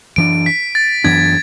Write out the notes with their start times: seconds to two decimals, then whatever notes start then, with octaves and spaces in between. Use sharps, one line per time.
0.16 F#2 E3 B3 D4 D7
0.46 B6
0.75 A6
1.04 F#2 E3 B3 D4 G#6